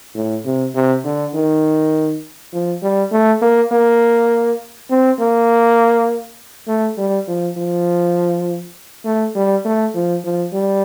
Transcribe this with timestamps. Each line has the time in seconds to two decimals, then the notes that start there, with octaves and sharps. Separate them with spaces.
0.15 A2
0.45 C3
0.75 C3
1.05 D3
1.34 D#3
2.53 F3
2.82 G3
3.12 A3
3.41 A#3
3.71 A#3
4.90 C4
5.20 A#3
6.68 A3
6.97 G3
7.28 F3
7.57 F3
9.05 A3
9.35 G3
9.65 A3
9.94 F3
10.24 F3
10.54 G3